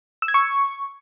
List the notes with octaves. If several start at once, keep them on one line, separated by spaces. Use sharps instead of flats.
E6
G#6
C#6